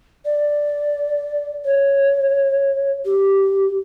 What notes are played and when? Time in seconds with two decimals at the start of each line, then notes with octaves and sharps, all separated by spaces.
0.25 D5
1.65 C#5
3.05 G4